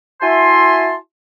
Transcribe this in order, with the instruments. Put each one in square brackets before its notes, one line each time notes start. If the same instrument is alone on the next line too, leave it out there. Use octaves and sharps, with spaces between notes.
[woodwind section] E4 F#4 E5 G#5 A5 C6